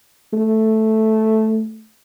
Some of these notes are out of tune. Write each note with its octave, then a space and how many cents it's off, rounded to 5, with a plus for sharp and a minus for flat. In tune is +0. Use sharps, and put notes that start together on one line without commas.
A3 -5